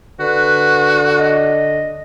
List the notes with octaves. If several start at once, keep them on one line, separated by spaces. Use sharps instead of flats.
D3 F#4 B4
D#5